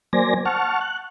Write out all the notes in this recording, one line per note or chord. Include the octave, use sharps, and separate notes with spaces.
F#3 A#3 C5 D5 G#5 A#6
F#5 A5 C#6 F6
F#6